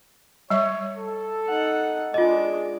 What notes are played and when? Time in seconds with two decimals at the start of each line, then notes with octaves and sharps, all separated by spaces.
0.50 G3 C#5 E5
0.97 A4
1.49 D#4 F#5
2.14 G#3 D4 F4 D#5 D6